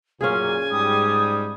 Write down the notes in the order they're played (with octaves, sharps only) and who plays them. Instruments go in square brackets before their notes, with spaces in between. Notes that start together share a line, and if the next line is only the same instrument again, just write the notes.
[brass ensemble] F#2 A#2 [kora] C#4 F4 G#4 [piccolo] G#5
[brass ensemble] G#2 G3 [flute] D#6